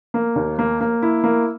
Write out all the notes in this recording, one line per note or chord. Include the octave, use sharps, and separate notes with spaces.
A#3
D#2
A#3
A#3
E4
A#3